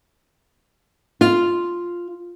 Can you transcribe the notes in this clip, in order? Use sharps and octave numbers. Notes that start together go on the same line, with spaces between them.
F4